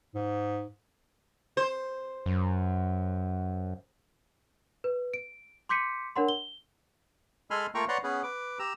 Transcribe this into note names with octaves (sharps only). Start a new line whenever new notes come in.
G#2
C5
F#2
B4
D7
C6 D6 G6 B6 C#7 D#7
D4 A#4 C#5 F#5 B5 C6
G7
G#3 A4 G#5 B5 C6 F6
A3 A#3 F4 G5 A#5 C#6
B4 C#5 D5 F#5 A#5 C6
B3 C#4 G#4 B4
B4 D6
G4 A#5 E6